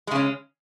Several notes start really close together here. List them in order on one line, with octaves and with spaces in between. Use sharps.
G#3 C#3 C#4